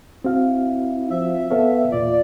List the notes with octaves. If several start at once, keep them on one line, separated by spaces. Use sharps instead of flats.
C4 E4 F#4 F5
F3 E5
B3 A4 C#5 F5
E2 A#2 F4 D5